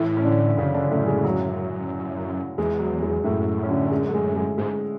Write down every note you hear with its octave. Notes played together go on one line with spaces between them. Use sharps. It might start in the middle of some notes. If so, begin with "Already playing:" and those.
Already playing: A2 E3 E4
C#4
D3 D4
F#2 C#3 C#4
D3 D4
F#2 A2 A3
G#3
F#3
E2 G#3
F#3
G#3
F#2 A2 A3
C#4
D3 D4
G#3
A3
G#3
G#3
G#2 G#3